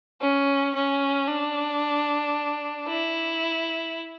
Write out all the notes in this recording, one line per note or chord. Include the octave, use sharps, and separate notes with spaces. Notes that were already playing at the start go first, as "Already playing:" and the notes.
C#4
C#4
D4
E4